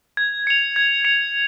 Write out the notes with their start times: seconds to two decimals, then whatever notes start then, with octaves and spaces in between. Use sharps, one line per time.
0.17 G#6
0.47 C#7 F7
0.76 G#6
1.05 C#7 F7